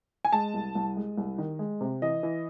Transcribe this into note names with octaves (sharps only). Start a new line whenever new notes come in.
G#5
G#3 A5
C2
C2
G#3
C2
D#3
G#3
C3
E3 D#5
E3